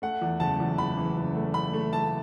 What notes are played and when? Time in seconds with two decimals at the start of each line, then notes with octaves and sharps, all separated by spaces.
0.02 A3 F#5
0.21 E2
0.40 F#1 A5
0.60 E2
0.78 F#1 B5
0.97 E3
1.17 F#1
1.35 A3
1.54 A3 B5
1.73 A3
1.93 A3 A5